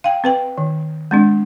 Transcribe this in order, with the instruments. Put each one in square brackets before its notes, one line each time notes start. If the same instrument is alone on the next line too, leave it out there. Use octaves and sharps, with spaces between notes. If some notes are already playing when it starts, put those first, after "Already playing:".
[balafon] F5 G5
C4 B4 G5
D#3
G#3 C4 D4